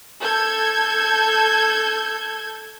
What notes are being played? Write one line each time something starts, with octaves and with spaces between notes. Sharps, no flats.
A4 G6 G#6